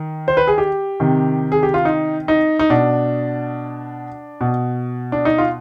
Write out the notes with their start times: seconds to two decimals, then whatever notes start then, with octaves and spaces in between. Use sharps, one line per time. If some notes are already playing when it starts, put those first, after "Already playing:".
Already playing: D#3
0.28 C5
0.37 B4
0.47 G#4
0.58 G4
1.00 C3 D#3
1.52 G#4
1.63 G4
1.74 F4
1.85 D#4
2.28 D#4
2.59 D#4
2.70 B2 D4
4.41 B2
5.12 D4
5.25 D#4
5.38 F4